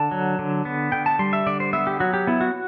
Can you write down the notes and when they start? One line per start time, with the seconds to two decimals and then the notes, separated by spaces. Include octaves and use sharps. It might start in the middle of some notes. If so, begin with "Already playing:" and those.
Already playing: D3 A5
0.11 F#3
0.39 D3
0.65 B3
0.92 D3 G5
1.06 A5
1.19 G3 C6
1.33 E5
1.46 D3 D5
1.60 C5
1.73 B3 E5
1.87 G4
2.00 F#3 F#4
2.14 G4
2.27 B3 E4
2.41 F#4